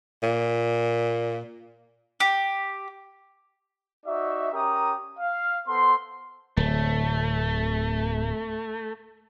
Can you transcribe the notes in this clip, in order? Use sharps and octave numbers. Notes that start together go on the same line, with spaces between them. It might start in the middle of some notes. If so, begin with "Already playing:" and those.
A#2
G4
D#4 F#4 D5 E5
C#4 G4 A#4 A#5 D#6
F5
B3 A4 C5 C6
D1 A3